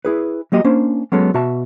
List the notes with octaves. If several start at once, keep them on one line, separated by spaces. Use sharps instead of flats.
E4 G#4 B4
F#3 A#3 G4 D#5
A#3 C#4 D4 C5
F#3 G#3 B3 C#4 A4
B2 F#4 E5 A5